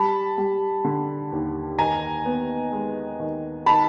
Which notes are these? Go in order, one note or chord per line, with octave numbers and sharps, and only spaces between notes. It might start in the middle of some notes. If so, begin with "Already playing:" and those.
Already playing: G3 A5 B5
G3
D3
D#2
D#3 G#5 A#5
B3
G#3
D#3
D#3 A5 B5